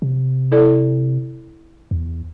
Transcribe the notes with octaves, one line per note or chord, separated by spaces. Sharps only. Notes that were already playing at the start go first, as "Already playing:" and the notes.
C3
E4 A4 D5
E2